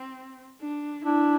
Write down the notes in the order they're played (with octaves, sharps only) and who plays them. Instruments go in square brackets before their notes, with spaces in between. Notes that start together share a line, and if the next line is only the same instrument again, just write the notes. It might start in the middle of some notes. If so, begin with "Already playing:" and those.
Already playing: [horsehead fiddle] C4
D4
[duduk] D4 [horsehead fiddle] E4